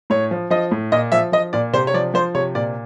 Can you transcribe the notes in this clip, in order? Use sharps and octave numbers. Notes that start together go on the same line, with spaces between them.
A2 C#5
F3
F3 D#5
A2
A#2 D#5
F3 E5
F3 D#5
A#2 D5
C3 C5
C#5
F3 D5
F3 C5
C3 C#5
A#2 D5